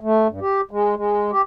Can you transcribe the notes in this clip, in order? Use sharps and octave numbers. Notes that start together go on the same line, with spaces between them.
A3
G2
G4
G#3
G#3
G4